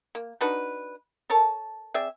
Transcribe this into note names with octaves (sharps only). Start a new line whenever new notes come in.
A#3
D4 D#4 F#4 B4
A4 A#4 C#5 A5
C4 G#4 D5 E5